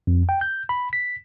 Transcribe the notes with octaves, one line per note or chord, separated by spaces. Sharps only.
F2
G5
G6
B5
B6